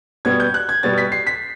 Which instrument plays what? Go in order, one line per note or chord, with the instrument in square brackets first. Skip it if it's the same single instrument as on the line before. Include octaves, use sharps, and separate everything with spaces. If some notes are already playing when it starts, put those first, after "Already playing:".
[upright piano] B2 G3 B3 G#6
G6
F#6
G#6
B2 G3 B3 A6
B6
C7
B6